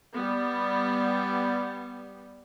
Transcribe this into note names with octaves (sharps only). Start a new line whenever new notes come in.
G3 B3